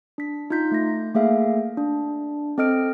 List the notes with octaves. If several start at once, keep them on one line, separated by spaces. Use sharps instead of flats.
D4 B6
D#4 F4 G6 B6
A3 A#6
A3 A#3 G#4 E5 F5
D4
C4 A4 D#5 F6 D7